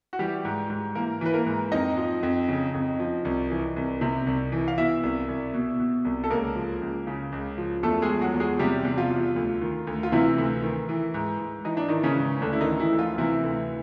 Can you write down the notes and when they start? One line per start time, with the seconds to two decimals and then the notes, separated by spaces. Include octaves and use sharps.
0.13 F#4
0.19 E3 G3 G4
0.45 G#2
0.70 G#2
0.95 E3 A#3 A#4
1.21 E3 B4
1.34 A#3 A#4
1.46 G#2
1.72 F2 D#4 D#5
1.97 F3
2.23 F2
2.49 C#3
2.74 F2
3.00 F3
3.25 C2
3.50 E3
3.76 C2
4.01 C3
4.27 C2
4.52 E3
4.68 F5
4.78 B2 E4 E5
5.03 C2
5.28 C2
5.54 B2
5.80 B2
6.05 C2
6.24 A4
6.30 C#2 A#3 A#4
6.56 F3
6.82 C#2
7.07 C#3
7.32 C#2
7.58 F3
7.83 E2 A3 A4
8.02 G#3 G#4
8.08 F3
8.21 F#3 F#4
8.34 E2
8.40 G#3 G#4
8.59 C3 G3 G4
8.85 E2
8.98 F3 F4
9.10 F3
9.36 D2
9.61 D#3
9.87 D2
10.03 F4
10.12 C3 E3 E4
10.38 D2
10.63 D#3
10.89 E3
11.14 G#2
11.39 G#2
11.65 E3 D#4
11.77 D4
11.88 D#3 E3 D#4
12.03 C#3 C#4
12.16 G#2
12.41 D2 D3 D4
12.53 E4
12.61 D#3 D#4
12.67 E3
12.80 E3 E4
12.93 D2
12.99 F3 F4
13.18 C3 E3 E4
13.43 D2